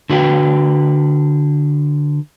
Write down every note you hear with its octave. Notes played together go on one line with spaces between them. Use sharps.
D3 F#4 B4 G5